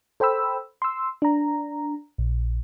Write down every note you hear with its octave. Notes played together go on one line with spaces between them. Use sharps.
A4 C5 G5 B5 E6
C6 E6
D4 A#5
A#1